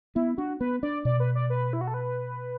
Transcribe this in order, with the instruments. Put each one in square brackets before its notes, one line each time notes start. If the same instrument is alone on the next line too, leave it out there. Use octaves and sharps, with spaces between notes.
[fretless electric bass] B3 [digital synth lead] E4
[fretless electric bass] D4 [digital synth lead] F#4
[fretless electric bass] B3 [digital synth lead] B4
[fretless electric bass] D4 [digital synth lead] D5
[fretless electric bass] B2 [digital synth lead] D5
[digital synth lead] B4
D5
B4
E4
F#4
A4
B4